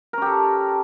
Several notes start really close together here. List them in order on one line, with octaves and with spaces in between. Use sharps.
A#4 C#4 G4 A4